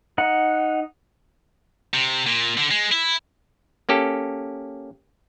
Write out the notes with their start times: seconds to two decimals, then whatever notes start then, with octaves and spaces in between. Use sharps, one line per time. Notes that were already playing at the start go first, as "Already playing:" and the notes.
0.18 D#4 F#5
1.94 C3
2.26 A#2
2.58 D3
2.71 G#3
2.92 E4
3.89 A#3 C#4 G4 A4